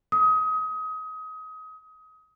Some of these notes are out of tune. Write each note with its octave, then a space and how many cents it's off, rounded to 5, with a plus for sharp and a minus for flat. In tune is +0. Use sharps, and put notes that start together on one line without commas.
D#6 +25